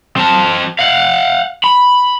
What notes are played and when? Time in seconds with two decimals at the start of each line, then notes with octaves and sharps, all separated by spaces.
0.16 C4 A5
0.79 F5 F#5
1.64 B5